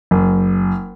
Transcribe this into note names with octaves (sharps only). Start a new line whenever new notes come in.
F#1